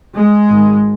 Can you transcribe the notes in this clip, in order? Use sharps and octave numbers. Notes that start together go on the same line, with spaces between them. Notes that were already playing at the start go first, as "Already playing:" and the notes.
G#3
G#1 G#2